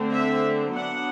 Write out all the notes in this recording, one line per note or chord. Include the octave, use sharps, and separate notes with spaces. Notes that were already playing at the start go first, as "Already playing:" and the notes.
Already playing: D3 A3 C4
E5
F#3 B3 D4 F#5